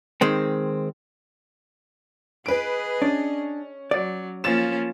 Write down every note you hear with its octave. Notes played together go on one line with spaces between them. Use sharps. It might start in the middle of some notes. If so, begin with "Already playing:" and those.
D#3 G#3 C4
G#4 B4 D#5 D7
C#4 D4
F#3 D5
F3 A#3 C#4 A6 E7